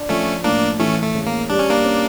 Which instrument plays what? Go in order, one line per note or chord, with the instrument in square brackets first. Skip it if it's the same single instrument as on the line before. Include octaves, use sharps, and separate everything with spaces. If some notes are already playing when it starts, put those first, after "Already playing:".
Already playing: [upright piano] D4
[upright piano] F3 [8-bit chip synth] A3 C#4
[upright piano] A2 [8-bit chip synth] A#3 D4
[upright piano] E3 [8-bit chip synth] A3 C#4
[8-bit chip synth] A3
[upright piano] C#3
[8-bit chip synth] A#3
[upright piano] G3 [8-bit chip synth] D4
[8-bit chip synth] C#4
A#3 D4
[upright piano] C#4